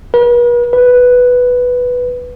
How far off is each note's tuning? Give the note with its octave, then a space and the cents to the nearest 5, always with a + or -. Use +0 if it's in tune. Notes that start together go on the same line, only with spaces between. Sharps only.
B4 -45
B4 +0